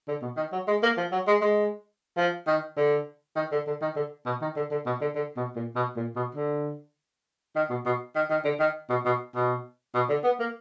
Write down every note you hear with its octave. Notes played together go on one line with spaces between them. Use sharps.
D3
B2
D#3
F#3
G#3
A#3
F3
F#3
G#3
G#3
F3
D#3
D3
D#3
D3
D3
D#3
D3
B2
D#3
D3
D3
B2
D3
D3
B2
A#2
B2
A#2
B2
D3
D#3
B2
B2
D#3
D#3
D3
D#3
B2
B2
B2
B2
D3
B3
A#3